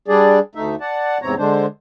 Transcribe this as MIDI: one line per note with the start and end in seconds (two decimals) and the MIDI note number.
0.08 0.39 55
0.08 0.39 62
0.08 0.39 68
0.08 0.39 74
0.55 0.75 38
0.55 0.75 57
0.55 0.75 63
0.55 0.75 76
0.81 1.18 74
0.81 1.18 78
0.81 1.18 81
1.22 1.35 40
1.22 1.35 44
1.22 1.35 48
1.22 1.35 60
1.22 1.35 73
1.22 1.35 82
1.38 1.66 50
1.38 1.66 56
1.38 1.66 62
1.38 1.66 72